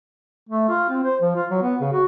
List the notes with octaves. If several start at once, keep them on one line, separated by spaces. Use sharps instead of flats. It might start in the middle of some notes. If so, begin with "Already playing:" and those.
A3
F4
C4
C5
F3
F4
F#3
B3
C#3
F#4